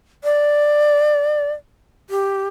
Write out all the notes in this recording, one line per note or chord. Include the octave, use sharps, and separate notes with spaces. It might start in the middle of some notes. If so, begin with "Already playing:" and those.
D5
G4